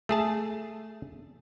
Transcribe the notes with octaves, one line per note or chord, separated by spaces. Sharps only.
A3 G#4 A5